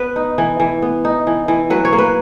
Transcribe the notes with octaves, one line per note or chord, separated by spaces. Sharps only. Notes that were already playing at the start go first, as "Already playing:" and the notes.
Already playing: B3 B4
D#4
E3
E3
B3
D#4
E3
E3
F#3 B4
C#5
A#3
B4